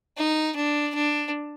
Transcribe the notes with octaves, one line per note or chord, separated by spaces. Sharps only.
D#4
D4
D4